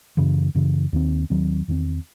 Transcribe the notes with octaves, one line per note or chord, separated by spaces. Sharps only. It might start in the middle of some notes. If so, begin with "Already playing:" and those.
F#2 C#3 E3
F#2 C#3 E3
D#2 D#3 F#3 C4
D#2 D#3 F#3 C4
E2 D#3 A3 C4